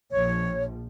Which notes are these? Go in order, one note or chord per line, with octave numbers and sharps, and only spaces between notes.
A#1 F3 C#5